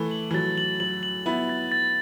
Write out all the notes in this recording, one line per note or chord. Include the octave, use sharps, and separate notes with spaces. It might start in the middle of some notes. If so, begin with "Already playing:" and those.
Already playing: E3 A3
F#7
E3
F#3 A6
F#7
F#3 F#7
F#7
B3 E4 F#7
A6
A6